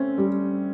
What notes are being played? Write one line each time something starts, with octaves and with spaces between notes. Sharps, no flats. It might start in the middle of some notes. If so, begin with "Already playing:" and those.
Already playing: A3 C4 C#4
G3